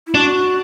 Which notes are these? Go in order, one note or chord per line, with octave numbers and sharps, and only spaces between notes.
E4
D4 F#4